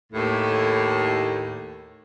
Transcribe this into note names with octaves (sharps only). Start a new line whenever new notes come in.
D#2 A2